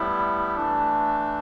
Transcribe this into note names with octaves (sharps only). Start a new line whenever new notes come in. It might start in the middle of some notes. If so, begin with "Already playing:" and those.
Already playing: A2 G3 B3 E4
E3 A3 D4